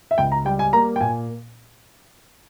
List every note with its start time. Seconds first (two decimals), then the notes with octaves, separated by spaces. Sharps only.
0.11 E5
0.18 C#2 G5
0.32 A#5
0.45 G3 G5
0.59 G#5
0.73 A#3 A#5
0.96 G5
1.01 A#2 G#5